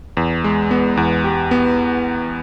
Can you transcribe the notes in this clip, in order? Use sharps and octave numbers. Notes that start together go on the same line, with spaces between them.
E2
G#3
B3
E2
G4
B3